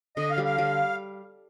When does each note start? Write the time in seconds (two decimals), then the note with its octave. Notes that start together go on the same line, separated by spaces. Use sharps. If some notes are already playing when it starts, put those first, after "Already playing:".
0.17 D3 D#5
0.31 F5
0.38 G3
0.45 F5
0.58 G3